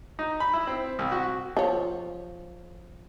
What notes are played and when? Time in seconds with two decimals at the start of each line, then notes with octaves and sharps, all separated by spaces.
0.19 D#4
0.40 B5
0.54 E4
0.67 C4
0.99 C2
1.12 F#4
1.57 F3 C#5